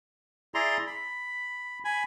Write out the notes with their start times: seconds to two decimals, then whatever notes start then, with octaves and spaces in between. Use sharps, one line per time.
0.54 E4 G#4 D5 A#5 C6
0.87 B5
1.85 G#5 B5